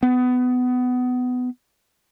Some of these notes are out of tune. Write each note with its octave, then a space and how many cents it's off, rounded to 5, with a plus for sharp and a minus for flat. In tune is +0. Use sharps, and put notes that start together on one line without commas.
B3 +20